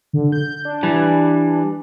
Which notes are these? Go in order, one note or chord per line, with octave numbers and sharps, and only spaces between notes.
D3
G6
D4
E3 G3